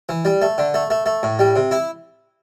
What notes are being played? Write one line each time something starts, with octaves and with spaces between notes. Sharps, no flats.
E3
G3
A3
D3
A3
A3
A3
A2
G3
C3
E4